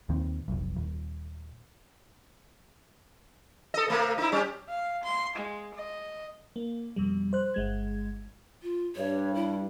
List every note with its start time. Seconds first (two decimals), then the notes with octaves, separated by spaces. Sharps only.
0.09 D#2 A#2 D#3 C4
0.48 F1 B1
0.77 D#1
3.74 A4 D#5
3.88 C3 A3 A#3
4.18 D#4 E4
4.32 G3 C#4 G4
4.69 F5
5.04 C6
5.36 G#3
5.75 D#5
6.56 A#3
6.96 F2 B2 G3
7.33 C5 F#6
7.54 G1 G#3 G#6
8.62 F4
8.96 G2 C#5
9.35 E4